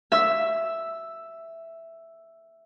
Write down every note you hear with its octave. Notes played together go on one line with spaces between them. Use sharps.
E5 E6